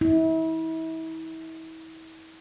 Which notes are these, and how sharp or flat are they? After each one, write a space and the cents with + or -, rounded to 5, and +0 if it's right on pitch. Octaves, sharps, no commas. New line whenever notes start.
E4 -35